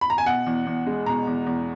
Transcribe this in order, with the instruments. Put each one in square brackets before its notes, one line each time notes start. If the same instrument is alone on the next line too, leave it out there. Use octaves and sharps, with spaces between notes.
[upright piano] B5
A#5
G#5
B2 F#5
E2
E2
G#3
B2 A#5
E2
E2